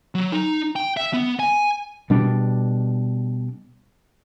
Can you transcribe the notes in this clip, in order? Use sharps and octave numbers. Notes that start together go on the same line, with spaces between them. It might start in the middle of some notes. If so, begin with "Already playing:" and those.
F#3
D#4
G5
E5
B3
G#5
B2 G3 D4